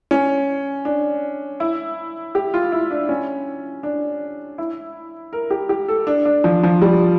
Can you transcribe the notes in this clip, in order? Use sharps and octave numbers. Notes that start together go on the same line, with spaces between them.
C#4
D4
E4
G4
F4
E4
D4
C#4
D4
E4
A#4
G4
G4
A4
D4
D4
F3
F3
G3